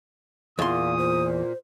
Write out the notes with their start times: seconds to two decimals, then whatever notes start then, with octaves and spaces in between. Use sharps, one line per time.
0.59 E2 A#2 F5 C6 D#6
0.98 C5